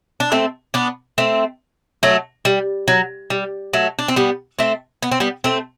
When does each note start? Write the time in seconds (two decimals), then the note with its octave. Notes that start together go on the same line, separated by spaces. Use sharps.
0.20 D4
0.32 A3 C4
0.74 B3 D4
1.18 A3 C4
2.03 F#3 A3
2.45 G3
2.88 F#3
3.30 G3
3.73 F#3 A3
3.99 D4
4.08 C4
4.16 G3 B3
4.59 A3 C4
5.02 B3
5.11 C4
5.20 G3 B3
5.44 A3 C4